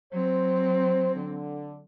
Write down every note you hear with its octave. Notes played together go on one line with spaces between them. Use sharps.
F#3 C4 C5
D3